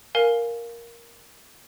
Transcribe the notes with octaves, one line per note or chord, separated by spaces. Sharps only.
A#4 F5 G#5